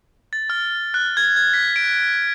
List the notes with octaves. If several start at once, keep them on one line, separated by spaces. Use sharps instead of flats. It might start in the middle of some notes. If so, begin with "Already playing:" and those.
A6
F6
F#6
G#6
G#6
B6
D7